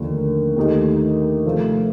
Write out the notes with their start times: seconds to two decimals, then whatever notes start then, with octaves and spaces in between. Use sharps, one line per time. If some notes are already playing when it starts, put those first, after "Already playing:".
Already playing: D#2 D3 F3 A3 D4
0.56 D#2 D#3 A3 D#4 G4
1.45 C3 F3 A3 C4